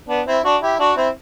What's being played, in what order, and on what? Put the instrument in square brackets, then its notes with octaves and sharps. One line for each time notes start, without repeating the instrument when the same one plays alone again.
[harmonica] B3 D4
C4 E4
D4 F#4
E4 G4
D4 F#4
C4 E4